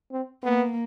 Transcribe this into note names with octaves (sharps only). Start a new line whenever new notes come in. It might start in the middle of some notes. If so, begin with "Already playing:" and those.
C4
A#3 B3